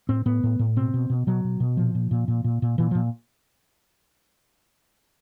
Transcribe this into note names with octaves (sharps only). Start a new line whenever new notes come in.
A2 C4
A2 B3
A2
A2
B2 C4
B2
B2
B2 F#3
B2
B2
A#2 F3
A#2
A#2
A#2
A#2
A#2
A#2 E3
A#2 F3